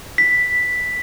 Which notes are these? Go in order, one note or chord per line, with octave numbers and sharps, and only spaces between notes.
B6